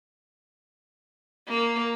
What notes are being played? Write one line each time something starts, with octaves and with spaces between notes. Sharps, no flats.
A#3